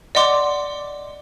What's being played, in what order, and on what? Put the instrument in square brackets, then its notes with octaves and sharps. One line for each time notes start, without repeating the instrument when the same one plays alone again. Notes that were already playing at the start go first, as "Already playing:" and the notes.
[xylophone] D5 D#5 F#5 C6 D6